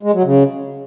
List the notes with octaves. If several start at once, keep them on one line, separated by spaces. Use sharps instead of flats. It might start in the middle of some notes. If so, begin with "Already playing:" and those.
G#3
F#3
C#3